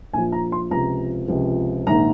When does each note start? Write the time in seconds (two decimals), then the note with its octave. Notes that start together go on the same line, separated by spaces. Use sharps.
0.13 A#1 A#2 F3 G#5
0.32 A#5
0.52 C6
0.71 C#2 C3 F3 A#5
1.28 C#2 C3 F3
1.87 A#1 G#2 D#3 A#5